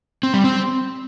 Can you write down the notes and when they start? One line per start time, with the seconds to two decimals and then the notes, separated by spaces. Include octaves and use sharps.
0.23 C4
0.34 G3
0.44 C4